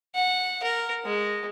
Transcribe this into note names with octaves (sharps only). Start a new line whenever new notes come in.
F#5
A#4
G#3